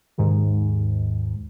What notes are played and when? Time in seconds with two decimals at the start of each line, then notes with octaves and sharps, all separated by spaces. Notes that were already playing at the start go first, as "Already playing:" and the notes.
0.18 D#2 G#2